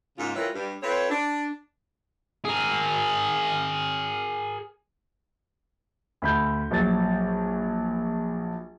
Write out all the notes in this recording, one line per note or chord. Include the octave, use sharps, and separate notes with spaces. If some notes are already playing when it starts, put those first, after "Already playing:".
G#2 C#3 A#3 F4
E3 G3 E4 F4 A#4 C#5
G2 G3
C4 F4 A4 B4 C#5
D4
G#4 A#4
D2 B5 G6
A#1 F#3 A6